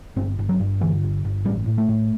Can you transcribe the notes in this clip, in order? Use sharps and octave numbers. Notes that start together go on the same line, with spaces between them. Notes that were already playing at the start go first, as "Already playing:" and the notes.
G1 C4
G1
F#3
G2
D3 E3
G1
G1
A1 G3
A2
A3
A2